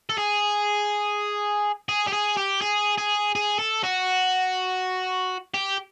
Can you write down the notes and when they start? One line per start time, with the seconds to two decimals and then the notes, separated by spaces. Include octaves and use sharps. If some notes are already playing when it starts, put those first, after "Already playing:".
0.10 A4
0.18 G#4
1.89 G#4
2.08 G4
2.13 G#4
2.37 G4
2.62 G#4
2.98 G#4
3.35 G#4
3.59 A4
3.83 F#4
5.54 G4